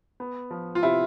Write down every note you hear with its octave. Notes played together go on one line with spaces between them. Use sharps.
B3
F3
F4
C3 E4